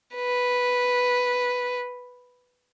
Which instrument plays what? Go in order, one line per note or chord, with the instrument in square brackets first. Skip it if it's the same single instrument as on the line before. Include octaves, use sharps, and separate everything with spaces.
[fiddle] B4